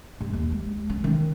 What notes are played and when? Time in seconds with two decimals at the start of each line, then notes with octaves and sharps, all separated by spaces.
0.21 G2
0.33 D#2
0.52 G#3
0.90 C#4
1.04 D#3